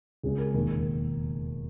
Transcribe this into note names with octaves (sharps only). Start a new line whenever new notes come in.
C#2 C#3 G#3 G#4
A#4
E1 D#2 D#3 A#3 A#4